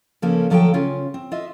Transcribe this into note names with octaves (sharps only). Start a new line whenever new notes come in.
C#3 F3 A#3 C#4 A4
D2 F3 F#3 A4 D5 G5
C#3 C#4 F4
C4
F4 D#5 E5